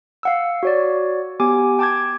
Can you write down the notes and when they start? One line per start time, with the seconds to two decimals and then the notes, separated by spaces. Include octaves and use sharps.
0.23 F5 F#5 E6
0.63 F#4 C#5 D5
1.40 B3 G4 G#5 D6
1.79 G5 A5 D6 G6 G#6